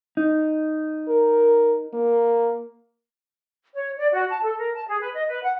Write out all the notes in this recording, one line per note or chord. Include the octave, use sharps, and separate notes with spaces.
D#4
A#4
A#3
C#5
D5
F#4
A5
A4
A#4
A5
G#4
B4
D#5
B4
F#5